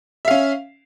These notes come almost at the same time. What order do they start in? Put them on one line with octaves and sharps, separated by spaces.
E5 F5 C#4